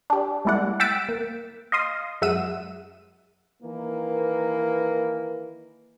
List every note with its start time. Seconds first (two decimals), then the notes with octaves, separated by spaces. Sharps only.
0.10 D4 G4
0.45 G3 G#3 A#3 E4 D5 F#5
0.80 F#5 G5 E6 A6 B6 D7
1.09 A#3
1.72 D#5 F5 C6 D#6
2.22 F#2 G#3 E5 F#5 E6 D#7
3.62 D#3 E3 A#3 B4